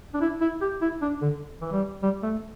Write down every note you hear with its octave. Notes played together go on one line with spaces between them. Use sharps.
D4
E4
E4
G4
E4
D4
D3
E3
G3
G3
A3